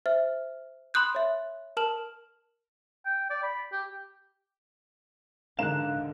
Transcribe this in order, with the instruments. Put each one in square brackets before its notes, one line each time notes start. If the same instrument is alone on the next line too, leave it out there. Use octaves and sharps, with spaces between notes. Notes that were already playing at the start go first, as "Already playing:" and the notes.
[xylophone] C5 E5 F6
B5 C6 D#6 F#6 G6
C#5 E5
A#4 A5 F6 E7 F#7
[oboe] G5
D5
B5
G4
[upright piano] G#2 A#4 E7 [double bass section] D3 [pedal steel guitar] F5 F#6